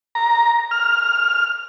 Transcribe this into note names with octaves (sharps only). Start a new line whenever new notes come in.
A#5
F6